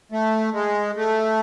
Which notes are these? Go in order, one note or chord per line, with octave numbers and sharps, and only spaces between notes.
A3
G#3
A3